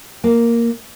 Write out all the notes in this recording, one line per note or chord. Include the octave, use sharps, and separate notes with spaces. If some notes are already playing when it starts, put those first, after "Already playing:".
A#3